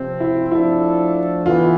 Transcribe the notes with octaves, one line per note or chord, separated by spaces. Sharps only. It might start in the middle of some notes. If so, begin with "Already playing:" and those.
Already playing: C3 F3 C4
E4
F3 A3 D4 E4 A4
E3 B3 F4